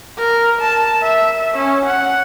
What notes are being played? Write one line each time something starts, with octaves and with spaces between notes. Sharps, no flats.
A#4
A5
E5
C#4
F#5